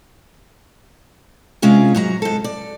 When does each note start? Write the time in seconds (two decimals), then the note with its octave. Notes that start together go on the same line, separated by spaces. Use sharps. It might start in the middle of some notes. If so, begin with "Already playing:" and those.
1.62 C3 G#3 C#4 F4 G#4
1.95 G#2 F#3 A#5
2.22 G#2 A4
2.44 D5